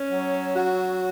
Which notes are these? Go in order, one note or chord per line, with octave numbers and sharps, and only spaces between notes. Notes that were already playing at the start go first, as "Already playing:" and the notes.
Already playing: C#4
F#3
F#4